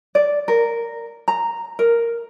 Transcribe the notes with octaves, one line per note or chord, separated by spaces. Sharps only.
D5
A#4
A#5
A#4